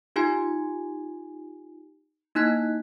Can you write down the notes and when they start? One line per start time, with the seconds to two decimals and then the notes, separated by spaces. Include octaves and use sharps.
0.16 D#4 F4 G4 G#5 G#6
2.35 A#3 D#4 E4 F#6 G#6 B6